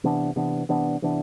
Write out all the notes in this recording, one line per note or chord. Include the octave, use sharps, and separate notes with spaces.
C3 E3 B3 D4
C3 E3 B3 D4
C3 E3 B3 D4
C3 E3 B3 D4